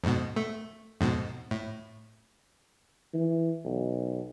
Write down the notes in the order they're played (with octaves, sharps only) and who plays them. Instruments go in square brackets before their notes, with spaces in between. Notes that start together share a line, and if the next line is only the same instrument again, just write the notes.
[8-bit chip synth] F2 G#2 B2
A3
F2 G#2 B2
A2
[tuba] E3
B1